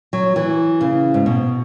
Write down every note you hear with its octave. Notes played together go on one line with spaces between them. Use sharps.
F#3
E3
C#3
G#2
B2